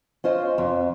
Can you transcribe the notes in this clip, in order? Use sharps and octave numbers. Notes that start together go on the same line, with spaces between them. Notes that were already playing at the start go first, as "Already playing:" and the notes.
C#4 F4 C5 D#5
F2